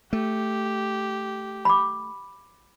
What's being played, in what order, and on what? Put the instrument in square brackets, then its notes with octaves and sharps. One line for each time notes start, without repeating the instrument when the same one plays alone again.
[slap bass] A3 [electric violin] G4
[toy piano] B5 D6